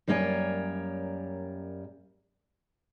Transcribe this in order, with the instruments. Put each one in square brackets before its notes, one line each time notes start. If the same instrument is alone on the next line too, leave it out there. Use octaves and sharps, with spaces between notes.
[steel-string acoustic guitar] F#2 G3 A#3 C#5 D5 G#5